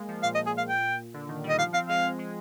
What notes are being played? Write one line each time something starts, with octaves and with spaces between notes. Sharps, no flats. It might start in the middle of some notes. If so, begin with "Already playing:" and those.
Already playing: G#3 A#3
F3
A#2 F5
D#5
G#4
F5
G5
D3
D#3
G3
D#5
F3 F5
C4 F5
G#3 F5
G#3